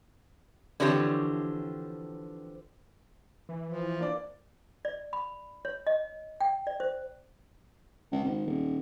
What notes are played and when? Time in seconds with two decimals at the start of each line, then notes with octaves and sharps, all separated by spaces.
0.80 D3 E3 F3 C4 G4 C#5
3.49 E3
3.67 F3
3.99 A#3 D4 D5
4.85 D5
5.13 B5
5.65 C#5
5.87 D#5
6.41 G5
6.67 D5
6.80 C5
8.12 C#2
8.24 G#1
8.46 D#1